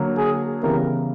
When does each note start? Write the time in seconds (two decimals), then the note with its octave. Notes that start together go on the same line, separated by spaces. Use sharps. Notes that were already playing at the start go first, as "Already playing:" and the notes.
Already playing: D3 F#3 A#3
0.17 G#4
0.63 C#3 E3 G3 B3 A#4